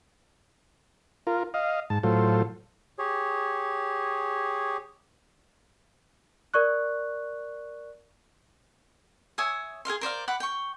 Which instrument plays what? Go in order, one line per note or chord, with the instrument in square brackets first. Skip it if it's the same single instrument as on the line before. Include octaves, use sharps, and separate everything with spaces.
[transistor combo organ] F4 A#4
D#5 F5
G#2 A5
A2 F#3 F4 A4 C5
[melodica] G4 G#4 C#5
[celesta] A#4 D5 C#6 F#6
[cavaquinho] C#5 E5 G#5 D#6
G#4 A#4 F5 C6
A#4 C5 D5 F5
F#5 B5 D6
G5 C#6